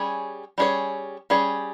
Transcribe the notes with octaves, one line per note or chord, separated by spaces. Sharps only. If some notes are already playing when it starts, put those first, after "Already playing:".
Already playing: G3 C#4 G#4 C#5
G3 C#4 G#4 C#5
G3 C#4 G#4 C#5